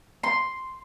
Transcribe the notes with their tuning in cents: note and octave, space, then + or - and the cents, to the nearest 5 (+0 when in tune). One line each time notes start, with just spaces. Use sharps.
C6 +0